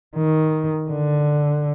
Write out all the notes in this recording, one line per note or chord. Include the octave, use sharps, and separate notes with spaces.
D#3
D3